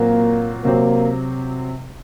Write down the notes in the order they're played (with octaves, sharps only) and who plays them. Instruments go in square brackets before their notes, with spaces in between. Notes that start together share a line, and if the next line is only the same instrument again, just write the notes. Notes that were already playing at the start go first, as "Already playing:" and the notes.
Already playing: [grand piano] A#2 F#3 C4 F#4 [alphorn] A#3
[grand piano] C3 F#3 C4 [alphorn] A#3